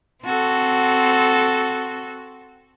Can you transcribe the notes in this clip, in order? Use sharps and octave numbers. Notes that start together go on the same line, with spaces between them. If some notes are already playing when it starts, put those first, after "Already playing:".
C4 F#4 A4